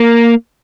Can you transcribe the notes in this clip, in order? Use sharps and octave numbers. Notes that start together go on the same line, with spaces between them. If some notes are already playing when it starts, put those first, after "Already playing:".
Already playing: A#3